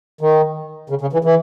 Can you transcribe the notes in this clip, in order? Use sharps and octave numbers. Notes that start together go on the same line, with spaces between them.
D#3
C#3
C#3
E3
E3